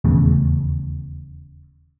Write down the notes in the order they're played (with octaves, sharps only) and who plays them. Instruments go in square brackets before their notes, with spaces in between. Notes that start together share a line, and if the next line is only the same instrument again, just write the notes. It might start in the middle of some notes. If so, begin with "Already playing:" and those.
[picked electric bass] D#1 E2 C#3 A3